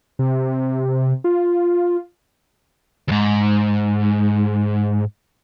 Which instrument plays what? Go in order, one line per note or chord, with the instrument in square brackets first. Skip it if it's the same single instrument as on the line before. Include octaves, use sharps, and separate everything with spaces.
[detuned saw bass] C3
F4
[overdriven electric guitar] D#2 G#2